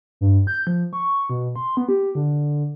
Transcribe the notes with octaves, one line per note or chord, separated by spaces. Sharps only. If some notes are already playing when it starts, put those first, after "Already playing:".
G2
G6
F3
C#6
B2
C6
B3
G4
D3